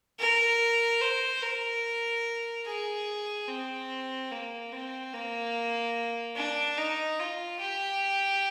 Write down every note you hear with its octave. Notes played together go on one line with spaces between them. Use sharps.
A#4
C5
A#4
G#4
C4
A#3
C4
A#3
D4
D#4
F4
G4